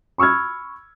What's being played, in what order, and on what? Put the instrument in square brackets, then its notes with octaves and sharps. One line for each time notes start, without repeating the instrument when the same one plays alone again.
[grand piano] B5 C#6 E6 F6 G#6